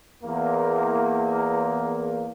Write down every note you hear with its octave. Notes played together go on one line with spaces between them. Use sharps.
E2 A#3